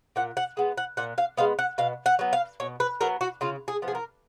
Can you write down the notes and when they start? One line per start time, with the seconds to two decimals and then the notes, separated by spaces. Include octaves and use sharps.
0.16 A#2 F#5
0.37 F#5
0.57 G#3 B3
0.78 F#5
0.97 A#2 F#5
1.18 F5
1.37 G#3 B3 F5
1.59 F#5
1.78 B2 F5
2.06 F#5
2.19 F#3 B3
2.33 F5
2.60 B2 C#5
2.80 B4
3.01 F#3 B3 A#4
3.21 F#4
3.41 C#3 F4
3.68 G#4
3.82 F3 B3
3.88 G#4
3.95 A#4